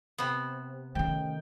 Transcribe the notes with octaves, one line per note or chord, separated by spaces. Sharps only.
C3 B3
D#3 A3 C#4 G5